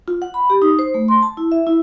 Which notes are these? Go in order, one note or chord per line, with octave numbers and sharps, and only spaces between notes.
F4
F#5
B5
G4
D#4
C5
A3
C6
A5
E4
E5
E4